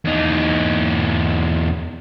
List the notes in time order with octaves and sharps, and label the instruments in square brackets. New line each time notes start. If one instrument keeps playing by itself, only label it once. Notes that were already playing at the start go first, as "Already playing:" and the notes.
[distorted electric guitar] E2 D#4